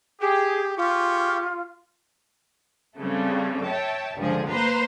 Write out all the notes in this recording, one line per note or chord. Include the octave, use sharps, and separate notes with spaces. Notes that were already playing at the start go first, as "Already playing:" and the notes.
G4 G#4
F4 G4 G#4 C#6
C#3 G3 A3 C4
C#5 E5 G5 A5
C#2 G2 D3 F3 G#4
A#3 B4 C5 A#5 C6